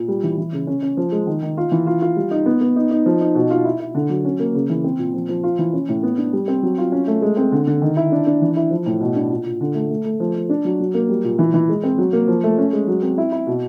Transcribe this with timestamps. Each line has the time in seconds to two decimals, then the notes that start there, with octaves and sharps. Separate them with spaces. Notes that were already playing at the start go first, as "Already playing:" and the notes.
Already playing: A#2
0.08 G3
0.23 E3
0.38 E3
0.53 C#3
0.67 C#4
0.82 C#4
0.97 F3
1.12 G#3
1.27 D#3
1.42 D#3
1.57 F4
1.72 E3
1.87 F4
2.02 F4
2.16 G3
2.31 D#4
2.46 B3
2.61 B3
2.76 D#4
2.91 D#4
3.06 F3
3.21 D#4
3.35 B2
3.50 F4
3.65 E4
3.80 E4
3.95 D3
4.09 F#3
4.25 C#4
4.39 A#3
4.55 C#3
4.70 E3
4.84 C4
4.99 A#2
5.14 F3
5.29 F3
5.43 F4
5.59 E3
5.73 C#4
5.89 A2
6.03 B3
6.18 D4
6.33 G3
6.48 C4
6.63 F#3
6.78 F4
6.92 C#4
7.07 A3
7.22 G#3
7.37 C4
7.52 D3
7.67 D3
7.82 D#3
7.97 E4
8.12 D4
8.26 D4
8.42 E3
8.57 E4
8.71 F3
8.86 A2
9.01 B2
9.16 D4
9.31 A#2
9.45 A#2
9.61 D3
9.75 A3
9.90 A3
10.05 A3
10.20 F3
10.35 F3
10.49 D4
10.65 F#3
10.80 F#3
10.94 A#3
11.09 G3
11.24 A#2
11.39 E3
11.54 E3
11.69 G#3
11.83 C4
11.98 F#3
12.13 A#3
12.28 F3
12.44 A3
12.58 C#4
12.73 G#3
12.87 F#3
13.02 C4
13.18 E4
13.32 E4
13.47 B2